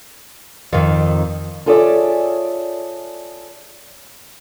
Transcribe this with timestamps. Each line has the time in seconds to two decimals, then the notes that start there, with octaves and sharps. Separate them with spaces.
0.73 F2 D#3
1.66 F4 G#4 A4 C#5 D5 E5